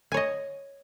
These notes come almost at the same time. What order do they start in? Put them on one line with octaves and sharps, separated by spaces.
G#5 C#5 D#5